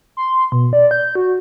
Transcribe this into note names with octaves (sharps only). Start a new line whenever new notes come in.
C6
B2
D5
G6
F#4